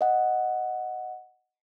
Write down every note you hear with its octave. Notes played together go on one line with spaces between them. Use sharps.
D#5 F#5